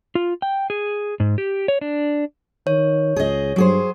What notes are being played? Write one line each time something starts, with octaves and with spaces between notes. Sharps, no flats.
F4
G5
G#4
G#2
G4
C#5
D4
D#3 C#5
C#2 G#4 D#5
G2 F#3 G#4 C5